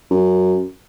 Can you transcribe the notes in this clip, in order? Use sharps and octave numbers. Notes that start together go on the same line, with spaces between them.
F#2